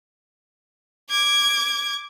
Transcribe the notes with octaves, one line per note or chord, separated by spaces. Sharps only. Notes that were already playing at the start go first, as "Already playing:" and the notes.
D6 G#6